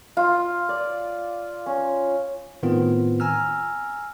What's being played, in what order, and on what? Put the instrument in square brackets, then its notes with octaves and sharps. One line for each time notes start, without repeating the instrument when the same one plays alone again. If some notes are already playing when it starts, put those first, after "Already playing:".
[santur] F4
D5
C#4
[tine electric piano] A2 D#3 B3 C4 F4
G#5 A#5 E6 F6